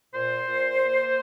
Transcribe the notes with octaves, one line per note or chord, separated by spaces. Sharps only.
A#2 C5
A#2
A#3